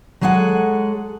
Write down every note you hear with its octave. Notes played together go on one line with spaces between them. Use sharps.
F#3 G#3 G#4 A4 F#5